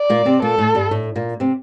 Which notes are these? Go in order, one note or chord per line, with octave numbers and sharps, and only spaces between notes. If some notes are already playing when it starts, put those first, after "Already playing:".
Already playing: D5
A#2 A#3
C3 C4
A#2 A#3 A4
A2 A3
G2 G3
A2 A3
A#2 A#3
C3 C4